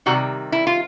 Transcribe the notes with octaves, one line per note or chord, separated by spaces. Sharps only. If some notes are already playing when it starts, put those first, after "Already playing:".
C3 D#3 G3 C4 F#4
E4
F4